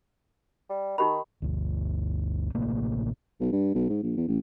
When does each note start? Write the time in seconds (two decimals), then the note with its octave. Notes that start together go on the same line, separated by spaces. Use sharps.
0.69 G3
0.98 D#3 D#4 G4 B5
1.42 G1 D2
2.55 A1 C3 A3 A#3
3.40 B1
3.52 G2
3.75 B1
3.89 G#2
4.03 A#1
4.16 E2
4.28 A1